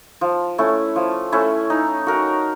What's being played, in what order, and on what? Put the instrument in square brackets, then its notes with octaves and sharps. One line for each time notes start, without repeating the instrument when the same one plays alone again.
[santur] F3
A3 C#4 E4
F3
A3 C#4 E4
D#4
F#4 A#4